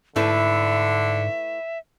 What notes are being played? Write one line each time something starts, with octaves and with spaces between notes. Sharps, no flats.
G#2 D3 A3 E4 B4 E5